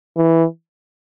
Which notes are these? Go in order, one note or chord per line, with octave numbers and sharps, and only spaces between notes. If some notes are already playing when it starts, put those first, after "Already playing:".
E3